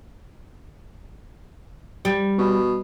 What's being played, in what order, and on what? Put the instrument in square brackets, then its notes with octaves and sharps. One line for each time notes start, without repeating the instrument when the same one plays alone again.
[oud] G3
[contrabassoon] B2